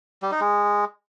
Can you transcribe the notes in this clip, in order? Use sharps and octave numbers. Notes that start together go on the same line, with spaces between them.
G3
D#4
G#3